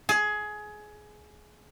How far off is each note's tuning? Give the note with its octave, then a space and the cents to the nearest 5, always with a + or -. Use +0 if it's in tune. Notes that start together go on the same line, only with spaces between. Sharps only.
G#4 +20